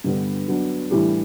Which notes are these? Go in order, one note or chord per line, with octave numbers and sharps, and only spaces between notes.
G2 D3 G3 B3
F#3 B3 D4
A2 E3 G3 D4 G4